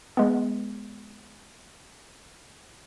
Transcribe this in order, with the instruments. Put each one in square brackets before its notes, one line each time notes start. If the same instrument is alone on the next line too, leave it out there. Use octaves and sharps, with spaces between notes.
[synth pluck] G#3 B3